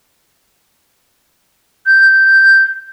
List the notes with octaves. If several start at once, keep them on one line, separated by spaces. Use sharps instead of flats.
G6